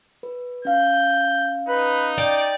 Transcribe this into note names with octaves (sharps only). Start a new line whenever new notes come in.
B4
C#4 F5 G6
D#4 B4
D5 G5